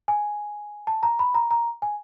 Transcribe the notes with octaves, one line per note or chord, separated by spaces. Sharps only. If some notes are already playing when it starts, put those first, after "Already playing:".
G#5
A5
A#5
B5
A#5
A#5
G#5